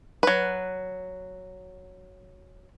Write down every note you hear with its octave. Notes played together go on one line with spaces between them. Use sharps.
F#3 B4